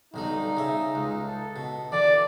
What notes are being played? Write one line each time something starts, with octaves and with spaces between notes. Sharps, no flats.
B1 D3 G3 D#4
C#3 E5
C#2
A4
B2
D3 E3 D5